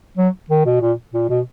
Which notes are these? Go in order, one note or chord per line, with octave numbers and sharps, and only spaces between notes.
F#3
D#3
B2
A#2
A#2
B2